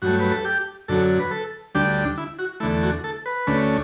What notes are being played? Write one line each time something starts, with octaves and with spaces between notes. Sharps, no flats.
G2 F#3 A3 F#4
B4
A4
G4
F#2 D3 F#3 A4
B4
A4
D2 D3 G3 D4 G4
E4
F#4
E2 D3 A3 E4
F#4
A4
B4
D2 D3 A3 C#4